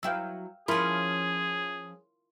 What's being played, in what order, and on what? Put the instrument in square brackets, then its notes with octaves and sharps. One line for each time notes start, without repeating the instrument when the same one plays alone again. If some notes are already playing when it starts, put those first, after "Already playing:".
[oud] F#3 E4 B4 [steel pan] F5 G5 E6
[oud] F3 C#4 [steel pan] E4 A#4 B5 [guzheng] F4 [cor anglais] G#4